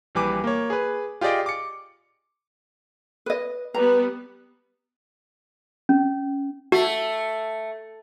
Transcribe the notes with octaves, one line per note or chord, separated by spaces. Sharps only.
A#1 E3 G3 B4 G#5 D6
A#3 C#5
G#4 B4
F4 G4 G#4 D5 D#5 G5
D6 C#7
B4 D#5
G3 B3 B4 A#5
C#4
A3 F#4